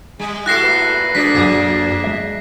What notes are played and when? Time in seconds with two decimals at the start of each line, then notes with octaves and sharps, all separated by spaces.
0.19 G3 G#3
0.46 E4 F#4 G4 A4 F#6 A#6 C7
0.62 A#2 A3 B4
1.15 D2 A#2 G3 D4 B6
1.34 C#2 F#2 F3 A#3 G#4
2.04 G#3 E5